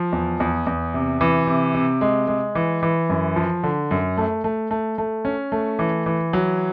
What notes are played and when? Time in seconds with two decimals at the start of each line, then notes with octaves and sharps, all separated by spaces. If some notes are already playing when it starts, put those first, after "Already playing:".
Already playing: F3
0.12 E2
0.40 E2
0.67 E2
0.94 C3
1.21 E3
1.47 C3
1.75 C3
2.01 G#3
2.28 G#3
2.55 E3
2.83 E3
3.09 F#2
3.36 F3
3.63 D3
3.91 F#2
4.17 A3
4.44 A3
4.71 A3
4.98 A3
5.25 C#4
5.52 A3
5.79 E3
6.06 E3
6.33 F#3